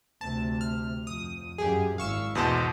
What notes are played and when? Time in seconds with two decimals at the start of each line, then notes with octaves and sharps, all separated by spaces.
0.21 D2 C3 A5
0.61 F6
1.07 F2 D#6
1.58 F#2 G4 G#4
1.98 G#1 E4 F5 C#6 E6
2.35 E2 B2 C5 D#5 A5